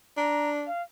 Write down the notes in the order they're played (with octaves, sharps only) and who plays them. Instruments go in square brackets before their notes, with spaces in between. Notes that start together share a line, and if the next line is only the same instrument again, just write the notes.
[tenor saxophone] D4 [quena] A#5
[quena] F5